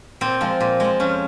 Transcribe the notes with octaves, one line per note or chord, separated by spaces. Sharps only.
A#2 C4
F3 G#3
A#2
F3 G#3
F2 C#4